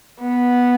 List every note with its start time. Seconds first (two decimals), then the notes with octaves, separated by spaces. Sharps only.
0.21 B3